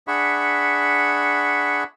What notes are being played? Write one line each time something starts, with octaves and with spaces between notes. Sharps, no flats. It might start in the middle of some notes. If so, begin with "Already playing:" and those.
D4 G#4 E5 F#5 B5 C#6